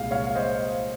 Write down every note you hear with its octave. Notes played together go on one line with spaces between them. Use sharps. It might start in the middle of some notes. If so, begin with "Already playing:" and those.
Already playing: C2 A#2 G#3 F5
C#5 F5
F5
C5 D#5